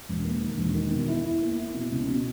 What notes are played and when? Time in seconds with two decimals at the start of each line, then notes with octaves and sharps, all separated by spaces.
0.09 E1
0.25 A#3
0.41 D#3
0.58 E1
0.75 D#3
0.92 B2
1.08 E4
1.25 E4
1.42 A#3
1.58 E4
1.74 B2
1.91 C#2
2.08 B2